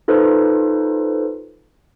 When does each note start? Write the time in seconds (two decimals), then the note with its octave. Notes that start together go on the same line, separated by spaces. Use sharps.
0.08 D#4 F4 A4 B4 C5